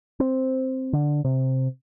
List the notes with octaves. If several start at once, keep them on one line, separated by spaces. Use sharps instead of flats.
C4
D3
C3